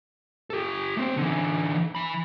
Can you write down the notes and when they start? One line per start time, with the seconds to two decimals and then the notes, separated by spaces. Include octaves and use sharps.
0.50 G4 A4
0.97 A3 C4
1.17 D3 E3
1.95 E3 B5